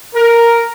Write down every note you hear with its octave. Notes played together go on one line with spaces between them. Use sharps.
A#4